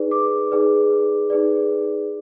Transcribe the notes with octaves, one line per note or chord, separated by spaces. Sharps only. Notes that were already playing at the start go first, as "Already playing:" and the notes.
Already playing: D#4 G#4 B4 D5
D6
D#4 G#4 B4 D5
D#4 G#4 B4 D5